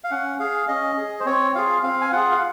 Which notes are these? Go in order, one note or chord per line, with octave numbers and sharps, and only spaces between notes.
F5
C#4 F#5
G#4 F5
C#4 D#5
G#4
C5
C4 C#5
F4 G#4 F5
C4 F5
G#5
F4 G#4 F#5
F5